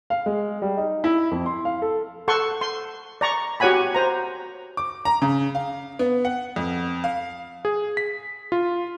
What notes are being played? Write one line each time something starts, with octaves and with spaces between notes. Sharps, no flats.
F5
G#3
G3
D#4
E4
F2
C6
F5
A4
A4 F#5 C6 C#6
C6
D5 A#5 C#6
F#4 G4 C#5 F#5 G#5 B5
C5 A#5
D6
A#5
C#3
F5
B3
F#5
F2
F5
G#4
B6
F4